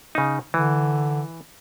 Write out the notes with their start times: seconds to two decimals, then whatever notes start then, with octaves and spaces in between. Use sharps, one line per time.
0.15 C#3 D#4
0.54 D3 E3